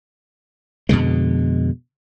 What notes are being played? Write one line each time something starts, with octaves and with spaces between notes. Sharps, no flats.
F2 B2 D3 G#3